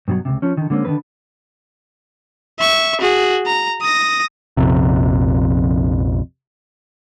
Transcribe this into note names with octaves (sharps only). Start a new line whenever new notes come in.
G2 B2 E3 F#3
C#2 G#2 C3
F3 C#4
D3 D#3
D3 G#3 A#3 C4 C#4
D3 D#3 F#3 A3 B4
E5 C#6
F#4 G#4
A#5
D#6 A#6
A#1 F2 C3